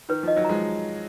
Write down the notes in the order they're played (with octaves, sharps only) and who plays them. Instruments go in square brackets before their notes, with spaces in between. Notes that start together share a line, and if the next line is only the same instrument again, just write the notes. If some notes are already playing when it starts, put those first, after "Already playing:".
[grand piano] D#3 [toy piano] B4
[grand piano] F3 [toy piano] D#5
[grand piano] D#3 F#3
[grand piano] F3 G#3 [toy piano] A#5